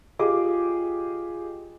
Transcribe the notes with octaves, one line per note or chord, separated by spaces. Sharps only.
F4 G4 G#4 D#5 D6